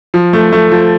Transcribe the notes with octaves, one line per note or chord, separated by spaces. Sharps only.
F3
A3
A3
F3